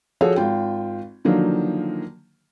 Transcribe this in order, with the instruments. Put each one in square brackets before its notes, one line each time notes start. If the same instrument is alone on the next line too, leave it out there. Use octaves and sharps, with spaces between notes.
[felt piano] F3 F#4 G#4 A4 C#5
G#1 F4 G5
D3 D#3 F3 F#3 A#3